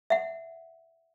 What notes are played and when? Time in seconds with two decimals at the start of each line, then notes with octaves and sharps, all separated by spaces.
0.10 E5 F#5